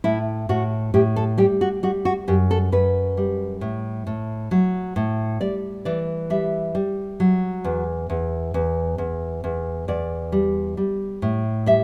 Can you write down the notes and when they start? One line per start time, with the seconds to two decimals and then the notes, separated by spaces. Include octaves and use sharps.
0.04 A2 E4
0.49 A2 F#4
0.94 A2 G4
1.16 A4
1.38 G3 G4
1.61 F#4
1.83 G3 F#4
2.05 F#4
2.28 F#2 G4
2.51 A4
2.72 F#2 B4
3.17 G3
3.61 A2
4.07 A2
4.51 F#3
4.96 A2
5.41 G3 D5
5.85 E3 D5
6.30 G3 E5
6.75 G3
7.20 F#3
7.64 E2
8.10 E2
8.54 E2
8.98 E2
9.44 E2
9.88 E2 D5
10.32 G3
10.77 G3
11.22 A2
11.66 G3 E5